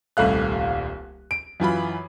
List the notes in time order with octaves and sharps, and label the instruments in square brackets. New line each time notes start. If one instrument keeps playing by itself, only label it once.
[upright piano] D#1 C2 A3 F5 F#6
D7
F#2 E3 F4 B5